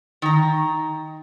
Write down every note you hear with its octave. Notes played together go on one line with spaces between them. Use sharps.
D#3 A#5